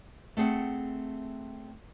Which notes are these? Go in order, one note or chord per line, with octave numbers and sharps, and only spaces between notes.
A3 C4 G#4 F#5